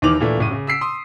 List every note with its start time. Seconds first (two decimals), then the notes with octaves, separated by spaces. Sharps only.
0.02 D#2 D#3 E3 D6 F7 F#7
0.20 A#2 E3 A3 D4
0.38 F#1 A2 D#7
0.51 C#3
0.67 E6 B6 C7 D7
0.81 C6 D#6